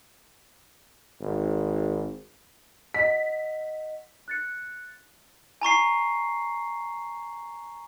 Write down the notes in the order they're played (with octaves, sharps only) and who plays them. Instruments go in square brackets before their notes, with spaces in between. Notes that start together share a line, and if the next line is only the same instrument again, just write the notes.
[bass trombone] G#1
[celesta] D#5 F#5 [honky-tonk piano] B6
[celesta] F#6 A6 C#7
[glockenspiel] G#5 A#5 C#6 C7